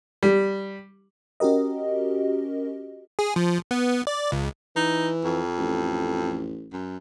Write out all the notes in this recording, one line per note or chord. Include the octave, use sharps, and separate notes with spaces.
G3
C#4 F#4 G4 A#4 D#5
G#4
F3
B3
D5
C#2
E3 D#4
F2
A1
F#2